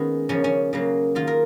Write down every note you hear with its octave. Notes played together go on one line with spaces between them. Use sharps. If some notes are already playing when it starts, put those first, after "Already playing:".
Already playing: D#3 G#3 A#3 B3 C#4
C#3 F3 A#3 C#4
C#4
C#3 F#3 A#3
D#3 A#3 F4
A#4